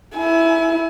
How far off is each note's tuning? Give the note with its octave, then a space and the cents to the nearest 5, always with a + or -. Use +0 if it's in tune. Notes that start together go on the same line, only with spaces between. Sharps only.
E4 +0 G#5 +35